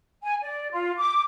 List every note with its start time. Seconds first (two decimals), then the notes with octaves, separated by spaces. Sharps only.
0.23 G#5
0.42 D5
0.71 F4
0.97 D6